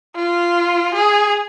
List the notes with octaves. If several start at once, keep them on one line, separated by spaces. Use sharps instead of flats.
F4
G#4